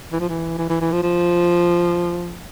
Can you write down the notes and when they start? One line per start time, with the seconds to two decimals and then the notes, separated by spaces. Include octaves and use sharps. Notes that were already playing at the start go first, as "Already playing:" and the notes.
0.12 E3
0.20 F3
0.29 E3
0.58 E3
0.69 E3
0.81 E3
0.92 F3
1.03 F3